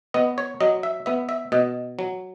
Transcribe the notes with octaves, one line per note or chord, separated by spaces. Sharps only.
B3 D#5
C#5
F#3 D#5
E5
B3 E5
E5
B2 D#5
F#3